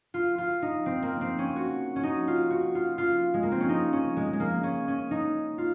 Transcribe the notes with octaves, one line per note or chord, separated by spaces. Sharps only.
F4
F4
D#4
C4
A#3
C4
C#4
F#4
C#4
D#4
F4
F#4
F4
F4
G#3
A#3
C4
C#4
D#4
C#4
G#3
G#3
A#3
C#4
C#4
D#4
F4